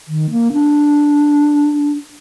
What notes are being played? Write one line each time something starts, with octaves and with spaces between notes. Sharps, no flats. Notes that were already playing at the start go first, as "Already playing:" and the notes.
D#3
A#3
D4